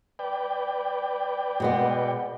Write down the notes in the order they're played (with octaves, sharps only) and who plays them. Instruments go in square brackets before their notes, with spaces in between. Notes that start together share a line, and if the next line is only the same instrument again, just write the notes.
[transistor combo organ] B4 D5 G5
[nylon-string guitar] B2 G#3 B3